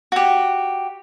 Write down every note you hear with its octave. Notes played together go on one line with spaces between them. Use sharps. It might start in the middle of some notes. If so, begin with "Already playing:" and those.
F#4 G4